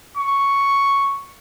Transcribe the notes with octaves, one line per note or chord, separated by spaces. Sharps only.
C#6